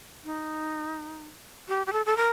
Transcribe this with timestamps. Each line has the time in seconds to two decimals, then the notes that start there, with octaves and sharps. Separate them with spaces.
0.24 D#4
1.68 G4
1.87 G4
1.93 A4
2.06 A4
2.17 A#4